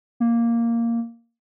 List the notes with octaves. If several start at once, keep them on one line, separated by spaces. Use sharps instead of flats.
A#3